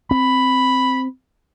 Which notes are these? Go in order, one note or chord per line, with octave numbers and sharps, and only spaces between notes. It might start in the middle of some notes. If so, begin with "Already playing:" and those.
C4 B5